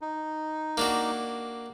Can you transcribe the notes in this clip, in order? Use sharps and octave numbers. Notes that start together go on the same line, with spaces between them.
D#4
A#3 D4 F#4